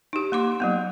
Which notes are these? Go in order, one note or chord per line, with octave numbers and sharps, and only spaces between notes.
D#4 G4
A#3 C6 D6
F#3 A#3 B3